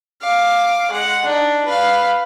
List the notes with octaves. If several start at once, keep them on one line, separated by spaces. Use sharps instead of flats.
F5 D6
G#3 F#5
D4 D#4
B4 F5